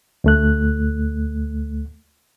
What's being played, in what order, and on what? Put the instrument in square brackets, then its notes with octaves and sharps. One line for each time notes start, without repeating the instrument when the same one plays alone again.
[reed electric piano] D2 A3 F#6